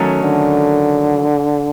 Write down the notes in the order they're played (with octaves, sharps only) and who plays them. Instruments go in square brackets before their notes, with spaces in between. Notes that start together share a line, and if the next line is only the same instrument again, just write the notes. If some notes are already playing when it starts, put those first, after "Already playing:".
Already playing: [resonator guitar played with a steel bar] D#3 F#3 A3 C#4
[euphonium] D3